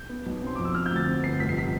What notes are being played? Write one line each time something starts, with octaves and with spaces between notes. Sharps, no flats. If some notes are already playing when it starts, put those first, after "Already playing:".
Already playing: G6
B3
B1
C4 C6
F2 D6
E6
C4 F6
G6
D2
A6
C4
G1 C7
F1 B6
C7
B6